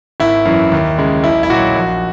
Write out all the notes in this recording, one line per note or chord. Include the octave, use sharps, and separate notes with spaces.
G#1 E4
F#2 E3
D#2
C#3 G#3
B1 E4
E4
A#2 F#3 F#4
A#1